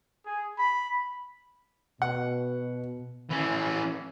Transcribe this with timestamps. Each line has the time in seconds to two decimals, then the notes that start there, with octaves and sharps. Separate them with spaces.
0.25 G#4
0.58 B5
2.02 B2 F#5
3.30 E3 C#4